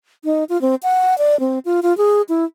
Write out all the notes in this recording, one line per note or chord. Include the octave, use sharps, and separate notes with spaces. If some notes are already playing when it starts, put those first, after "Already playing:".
D#4
F4
C4
F#5
D5
C4
F4
F4
G#4
E4